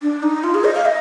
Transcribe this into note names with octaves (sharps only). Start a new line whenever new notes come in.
D4
D#4
F4
G#4
D#5
F5
D#5